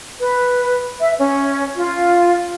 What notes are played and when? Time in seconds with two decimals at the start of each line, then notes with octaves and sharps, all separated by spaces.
0.19 B4
0.99 E5
1.18 C#4
1.76 F4